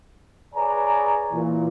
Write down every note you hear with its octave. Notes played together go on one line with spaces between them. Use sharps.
G#4 B4 C#5 D5 G#5 A#5
A#2 E3